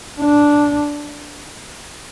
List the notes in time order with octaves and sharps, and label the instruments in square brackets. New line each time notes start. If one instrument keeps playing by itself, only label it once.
[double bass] D4